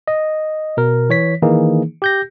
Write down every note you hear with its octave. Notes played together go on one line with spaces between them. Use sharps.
D#5
B2 A#4
E3 C#5 B6
D#3 E3 A#3 D#4 G#4
G4 G6 A#6